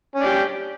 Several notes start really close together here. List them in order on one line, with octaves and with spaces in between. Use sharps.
C#4 D4 G4